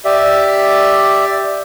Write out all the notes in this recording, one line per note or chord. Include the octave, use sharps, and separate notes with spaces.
G4 D5 E5